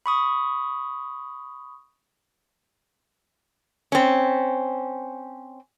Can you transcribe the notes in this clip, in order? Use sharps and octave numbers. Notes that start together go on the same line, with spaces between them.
B5 C#6 D#6
C4 C#4